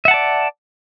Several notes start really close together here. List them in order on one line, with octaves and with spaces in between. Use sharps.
E5 F#5 A5 D5